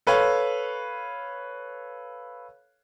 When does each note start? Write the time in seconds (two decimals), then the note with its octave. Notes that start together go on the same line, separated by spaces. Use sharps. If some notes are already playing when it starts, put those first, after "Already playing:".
0.07 A4 B4 C#5 F5